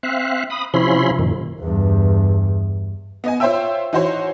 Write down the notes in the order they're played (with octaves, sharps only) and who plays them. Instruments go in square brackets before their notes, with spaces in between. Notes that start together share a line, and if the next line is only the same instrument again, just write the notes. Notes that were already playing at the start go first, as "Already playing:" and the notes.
[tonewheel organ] C4 E5 F5 F#6
B5 D#6
C3 F3 C#4 E4 B5 C6
F#2 A#2 D#3
[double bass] E2 G2
[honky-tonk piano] B3 D#5 G#5
F4 C5 C#5 E5 G5 E6
E3 D#4 F#4 C5 C#5